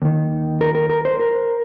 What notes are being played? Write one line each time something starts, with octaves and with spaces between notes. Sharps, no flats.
D#2 D#3
A#4
A#4
A#4
C5
A#4